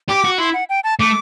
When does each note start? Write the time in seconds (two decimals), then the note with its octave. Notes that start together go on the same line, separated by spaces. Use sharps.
0.09 G4 D6
0.24 F#4
0.38 E4 C6
0.53 F#5
0.69 G5
0.84 A5
0.99 A3 D6